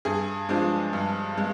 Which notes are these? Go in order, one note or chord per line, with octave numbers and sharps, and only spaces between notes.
G2 G#4
F3 G#3 D4
G2
G#3